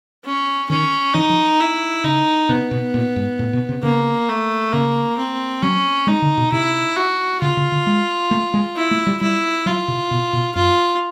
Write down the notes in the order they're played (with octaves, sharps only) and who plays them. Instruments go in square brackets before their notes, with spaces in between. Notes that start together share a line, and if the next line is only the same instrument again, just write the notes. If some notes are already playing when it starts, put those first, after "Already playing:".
[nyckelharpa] C#4
[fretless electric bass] D#3 [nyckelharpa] C#4
[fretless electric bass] E3 [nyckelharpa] D#4
[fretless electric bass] F3
[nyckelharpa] E4
[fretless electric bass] C#3 [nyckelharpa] D#4
[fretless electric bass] C3 [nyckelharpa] B3
[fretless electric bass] B2
A#2
G#2
A2
B2
C3
[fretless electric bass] C#3 [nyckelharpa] A#3
[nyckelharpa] A3
[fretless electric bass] C#3 [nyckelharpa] A#3
[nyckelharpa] C4
[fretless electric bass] F#3 [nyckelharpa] C#4
[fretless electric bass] G#3 [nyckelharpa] D#4
[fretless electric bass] D3
B2
[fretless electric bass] C3 [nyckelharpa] E4
[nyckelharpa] F#4
[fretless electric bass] C#3 [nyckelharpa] F4
[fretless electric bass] C#3
D3
G#3
A3
G#3
[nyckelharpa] E4
[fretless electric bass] A3
G3
[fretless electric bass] G3 [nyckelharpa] E4
[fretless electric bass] F#3 [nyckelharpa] F4
[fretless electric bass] C3
B2
B2
[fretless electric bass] F#2 [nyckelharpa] F4